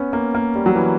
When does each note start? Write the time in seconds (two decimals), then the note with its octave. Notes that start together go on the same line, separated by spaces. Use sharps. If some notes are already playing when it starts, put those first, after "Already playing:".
Already playing: B3 C#4
0.13 A#3
0.35 A#3
0.55 G3
0.66 F#3
0.75 E3